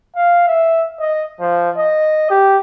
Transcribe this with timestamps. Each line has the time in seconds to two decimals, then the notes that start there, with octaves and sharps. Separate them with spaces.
0.15 F5
0.48 E5
1.00 D#5
1.40 F3
1.77 D#5
2.30 G4